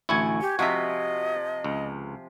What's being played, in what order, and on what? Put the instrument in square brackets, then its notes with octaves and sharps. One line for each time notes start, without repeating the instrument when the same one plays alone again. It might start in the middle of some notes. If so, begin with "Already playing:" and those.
[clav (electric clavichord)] A1 D2 E4 [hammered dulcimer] G#5 C#6
[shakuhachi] G4
[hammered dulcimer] C3 F3 [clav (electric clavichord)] F#4 E5 [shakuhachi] D#5
[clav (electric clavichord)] C#2